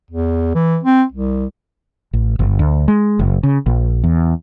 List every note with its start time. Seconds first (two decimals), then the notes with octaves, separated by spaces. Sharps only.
0.11 E2
0.55 E3
0.83 C4
1.12 C2
2.13 A1
2.39 G1
2.59 D2
2.88 G#3
3.19 F#1
3.43 C#3
3.66 A#1
4.04 E2